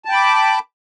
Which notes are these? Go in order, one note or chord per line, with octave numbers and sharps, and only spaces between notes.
G5 A5 B5 D6